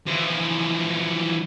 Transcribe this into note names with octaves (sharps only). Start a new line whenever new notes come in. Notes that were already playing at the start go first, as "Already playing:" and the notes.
E3 F3